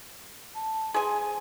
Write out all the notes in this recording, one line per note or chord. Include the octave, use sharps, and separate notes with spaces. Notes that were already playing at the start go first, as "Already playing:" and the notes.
A5
G#4 G#5 C6
C5